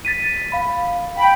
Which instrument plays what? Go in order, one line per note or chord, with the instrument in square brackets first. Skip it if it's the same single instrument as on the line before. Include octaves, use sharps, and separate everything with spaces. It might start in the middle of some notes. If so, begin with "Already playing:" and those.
[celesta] A6 B6 D#7
F5 B5
[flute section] G5 B5